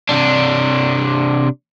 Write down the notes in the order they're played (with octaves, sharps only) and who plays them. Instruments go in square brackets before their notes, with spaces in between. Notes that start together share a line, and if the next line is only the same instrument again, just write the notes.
[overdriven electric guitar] C3 D4